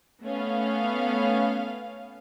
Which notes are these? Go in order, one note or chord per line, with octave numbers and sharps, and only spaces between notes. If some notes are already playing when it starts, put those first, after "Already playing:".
A3 B3 C#4 F5